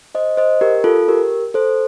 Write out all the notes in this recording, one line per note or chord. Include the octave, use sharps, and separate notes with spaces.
C5 D#5
C5 D#5
G4 A#4
F4 A4
G4 A#4
A4 C5